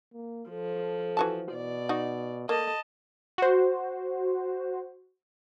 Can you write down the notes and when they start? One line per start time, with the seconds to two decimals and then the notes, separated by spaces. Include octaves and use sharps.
0.14 A#3
0.50 F3 A4
1.17 E3 F#4 A5
1.51 B2 D5
1.89 D#4 F#4
2.49 A#3 A4 D#5 A5
3.38 F#4 C5